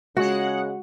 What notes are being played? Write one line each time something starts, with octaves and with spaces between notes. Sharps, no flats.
C#3 G#3 F#4 F#5